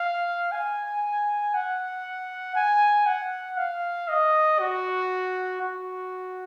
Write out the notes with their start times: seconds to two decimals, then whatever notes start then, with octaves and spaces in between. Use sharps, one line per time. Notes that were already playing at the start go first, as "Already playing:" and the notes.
Already playing: F5
0.52 G#5
1.54 F#5
2.56 G#5
3.06 F#5
3.58 F5
4.09 D#5
4.60 F#4
5.62 F#4